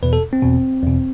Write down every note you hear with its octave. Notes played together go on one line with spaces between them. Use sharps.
E2 B2 B4
A4
C4
E2 B2
E2 B2